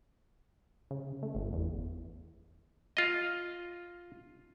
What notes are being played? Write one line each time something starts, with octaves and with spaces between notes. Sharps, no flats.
C#3
A3
G1
E2
F4 D#5